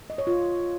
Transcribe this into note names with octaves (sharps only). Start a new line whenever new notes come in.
D#5
C#5
F4